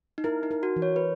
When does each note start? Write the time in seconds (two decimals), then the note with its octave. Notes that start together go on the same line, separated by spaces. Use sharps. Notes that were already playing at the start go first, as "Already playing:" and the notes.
0.18 D#4
0.24 E4 A#4
0.43 D#4
0.51 A#4
0.63 F#4
0.76 E3
0.82 C#5
0.96 B4